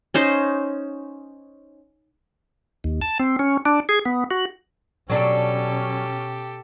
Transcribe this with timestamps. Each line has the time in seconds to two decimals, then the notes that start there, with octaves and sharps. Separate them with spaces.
0.14 C#4 D#4 C5 D#5
2.84 D#2
3.01 A5
3.20 C4
3.39 C#4
3.65 D4
3.89 G#4
4.05 B3
4.30 F#4
5.10 B2 F#3 C#4 D4 G4 A4